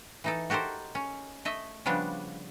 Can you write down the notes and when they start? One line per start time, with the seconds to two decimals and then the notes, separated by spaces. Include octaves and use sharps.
0.24 E3 D#4 A4
0.50 F#4 G4 A4 A#4 C5
0.95 C#4
1.45 A3 D#5 E5
1.86 C#3 F3 G3 B3 D4